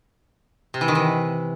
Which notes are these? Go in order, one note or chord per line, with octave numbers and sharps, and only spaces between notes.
C3
E3
D#3
E3